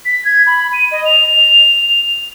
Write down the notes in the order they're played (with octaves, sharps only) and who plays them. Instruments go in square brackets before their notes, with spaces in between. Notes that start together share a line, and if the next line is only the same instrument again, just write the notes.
[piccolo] B6
G#6
B5
D#7
D#5
F7